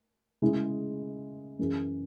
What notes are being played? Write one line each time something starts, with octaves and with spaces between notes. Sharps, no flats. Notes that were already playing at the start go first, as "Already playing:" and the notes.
C#3 G#3 E4 G#4
F#2 E3 C#4 G#4